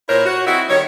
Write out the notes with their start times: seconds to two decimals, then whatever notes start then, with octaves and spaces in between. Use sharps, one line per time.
0.09 A#2 E4 A#4 C5 C#5
0.26 F#4
0.47 C4 D#4 E4 F#4
0.69 D#3 G3 C#5